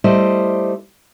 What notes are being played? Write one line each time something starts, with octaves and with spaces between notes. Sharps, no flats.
G3 A3 E4 C5 D5 D#5